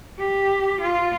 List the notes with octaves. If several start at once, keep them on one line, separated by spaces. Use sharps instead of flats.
G4
F4